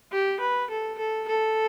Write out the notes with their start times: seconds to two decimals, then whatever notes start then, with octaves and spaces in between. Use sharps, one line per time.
0.12 G4
0.40 B4
0.70 A4
0.98 A4
1.28 A4